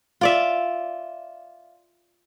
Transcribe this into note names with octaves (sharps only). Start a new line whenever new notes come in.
F4 D5 E5